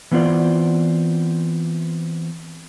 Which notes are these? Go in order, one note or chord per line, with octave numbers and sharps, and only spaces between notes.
E3 B3 C4 F4 D5